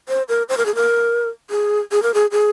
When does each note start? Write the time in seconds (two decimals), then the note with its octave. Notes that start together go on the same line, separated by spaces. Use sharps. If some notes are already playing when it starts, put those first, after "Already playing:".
0.09 C5
0.29 A#4
0.49 C5
0.57 A#4
0.66 G#4
0.75 A#4
1.50 G#4
1.92 G#4
2.03 A#4
2.14 G#4
2.32 G#4